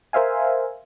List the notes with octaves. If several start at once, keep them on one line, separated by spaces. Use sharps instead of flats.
A#4 C5 E5 F5 G#5